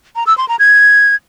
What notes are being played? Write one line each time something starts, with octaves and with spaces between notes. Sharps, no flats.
A#5
E6
C6
A#5
G#6